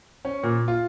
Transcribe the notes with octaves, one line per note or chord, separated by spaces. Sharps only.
C#4
A#2
F4